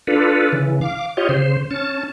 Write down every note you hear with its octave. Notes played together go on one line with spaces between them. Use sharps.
D4 F4 A4 B4
C#3 E3
F5 D6
F4 G4 C#5 D#5
C#3 C5
C#4 A5